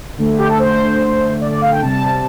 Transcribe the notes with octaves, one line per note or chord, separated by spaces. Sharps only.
D3 A3
G4
A4
C5
D5
D5
F5
G5
C3 G3 A5